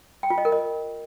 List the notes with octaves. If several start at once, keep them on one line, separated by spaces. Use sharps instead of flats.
G5
F4
D#5
A#4
D#5